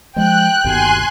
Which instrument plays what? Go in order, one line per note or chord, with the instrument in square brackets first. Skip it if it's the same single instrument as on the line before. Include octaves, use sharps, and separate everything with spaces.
[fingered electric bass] F3 G#3 [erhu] G5 [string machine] F#6
[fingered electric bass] G1 D#2 B2 [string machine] G#5 C6 F#6